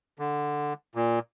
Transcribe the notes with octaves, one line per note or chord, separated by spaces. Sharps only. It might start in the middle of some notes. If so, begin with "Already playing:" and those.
D3
A#2